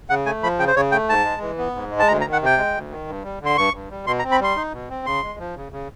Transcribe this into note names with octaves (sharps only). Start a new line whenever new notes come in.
C#3 F#5
A3 G#5
F3 B5
C#3 G5
C5
C#3 C#5
A3 G5
G#2 A5
G#3
E3
B3
G#2
G#3
A5
D2 A#5
A#5
D#3
F#5
C3 G5
G#3
D2
D#3
G2
G3
D3 C6
G2 C#6
G2
G3
B2 C6
A#5
C4
B5
G3 C6
D#4
B2
C4
C#3 C6
G#3
F3
C#3
C#3